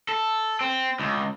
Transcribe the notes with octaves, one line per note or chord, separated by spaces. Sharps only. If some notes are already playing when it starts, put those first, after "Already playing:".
A4
C4
C#2